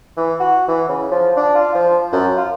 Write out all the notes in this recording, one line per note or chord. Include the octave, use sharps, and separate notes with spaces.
E3
F#4
E3
C#3
F3
D4
F4
F3
F#2
F4